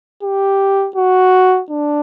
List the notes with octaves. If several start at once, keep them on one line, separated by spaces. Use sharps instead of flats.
G4
F#4
D4